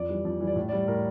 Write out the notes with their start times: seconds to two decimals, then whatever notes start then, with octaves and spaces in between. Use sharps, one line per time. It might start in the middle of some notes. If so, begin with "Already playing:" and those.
Already playing: F2 D5
0.09 E3 G3
0.25 F2 D5
0.40 E3 G3
0.47 D5
0.56 A2
0.69 G3 D5
0.88 A2 A#4